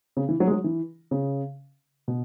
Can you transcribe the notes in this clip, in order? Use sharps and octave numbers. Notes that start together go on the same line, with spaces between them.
C#3
E3
F#3
G#3
F#3
E3
C#3
B2